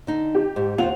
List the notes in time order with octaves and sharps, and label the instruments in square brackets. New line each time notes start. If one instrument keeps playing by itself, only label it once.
[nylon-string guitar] D3 D#4
[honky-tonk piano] G4
[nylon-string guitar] G#2
[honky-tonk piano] D#2 F#5 F7 [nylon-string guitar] C4 F4